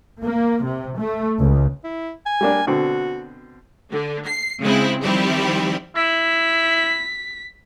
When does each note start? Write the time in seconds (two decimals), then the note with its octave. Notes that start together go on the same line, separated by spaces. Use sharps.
0.23 A#3
0.65 C3
0.99 A3
1.39 C#2
1.84 E4
2.26 G#5
2.41 G3 A#3 D4
2.67 B2 D3 C4 F#4
3.90 D3
4.26 C7
4.61 C#3 G#3 C4 E4
5.03 D#3 F3 G3 C4 E4 G4
5.96 E4 B6